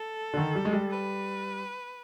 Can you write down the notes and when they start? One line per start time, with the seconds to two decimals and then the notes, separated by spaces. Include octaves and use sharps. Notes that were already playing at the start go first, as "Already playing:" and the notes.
Already playing: A4
0.34 D3
0.37 D#3
0.55 G3
0.65 G#3
0.73 G3
0.91 B4